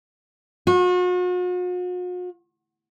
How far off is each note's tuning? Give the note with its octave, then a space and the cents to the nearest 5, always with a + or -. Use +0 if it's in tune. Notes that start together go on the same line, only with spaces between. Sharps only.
F#4 -45